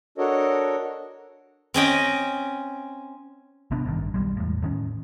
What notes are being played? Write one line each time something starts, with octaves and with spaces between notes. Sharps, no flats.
D4 F#4 A4 A#4 C#5 D#5
C4 C#4 D#5 G5
G#1 C3 B3 D4
A1 G2 D#3
B1 G3 G#3
E2 A2
A2 D#3 C#4